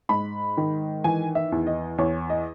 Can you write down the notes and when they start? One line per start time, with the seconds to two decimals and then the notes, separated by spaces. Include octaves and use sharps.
0.09 G#2 B5
0.57 D#3
1.04 E3 G#5
1.35 E5
1.52 E2
1.67 D#5
1.98 E2 C#5
2.30 D#5